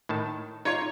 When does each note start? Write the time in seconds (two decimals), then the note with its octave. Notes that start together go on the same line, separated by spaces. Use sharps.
0.09 A2 D#3 A5
0.65 D#4 F4 C#5